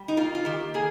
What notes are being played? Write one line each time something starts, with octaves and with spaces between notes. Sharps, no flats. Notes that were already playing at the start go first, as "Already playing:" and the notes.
Already playing: G3
D#4
A#3 F4
F4
D#3 G4
A#3 G#4